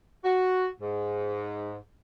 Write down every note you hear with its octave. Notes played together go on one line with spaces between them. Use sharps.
F#4
G#2